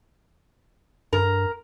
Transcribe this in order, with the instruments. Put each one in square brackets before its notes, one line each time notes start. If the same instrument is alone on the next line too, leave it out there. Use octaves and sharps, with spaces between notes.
[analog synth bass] G2 [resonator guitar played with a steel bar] A#4